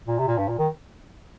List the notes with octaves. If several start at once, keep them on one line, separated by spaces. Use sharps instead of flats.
A#2
C3
A#2
G2
A#2
D#3